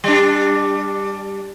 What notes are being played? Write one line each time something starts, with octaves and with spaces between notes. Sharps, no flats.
G3 D4